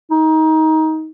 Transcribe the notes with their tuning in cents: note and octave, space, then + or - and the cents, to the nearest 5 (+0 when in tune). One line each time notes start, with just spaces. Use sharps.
D#4 +20